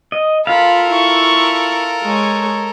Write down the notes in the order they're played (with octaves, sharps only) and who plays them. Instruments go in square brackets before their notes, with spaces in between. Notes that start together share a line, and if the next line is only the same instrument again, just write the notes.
[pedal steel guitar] D#5
[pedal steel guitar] F4 F5 [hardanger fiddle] A4 A#4 [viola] B5
[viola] E4 C#6
G#3 C#5